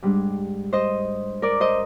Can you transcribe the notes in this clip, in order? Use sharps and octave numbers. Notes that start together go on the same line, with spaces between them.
G#2 G3 D4
C5 D#5
A#4 D5
C5 D#5